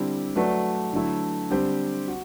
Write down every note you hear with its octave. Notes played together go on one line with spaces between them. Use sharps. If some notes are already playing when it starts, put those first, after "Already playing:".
Already playing: D3 G3 C4 E4 G4
F#3 A3 D4 F#4 B4
D3 F#3 A3 E4
D3 G3 C4 G4 C5
F#4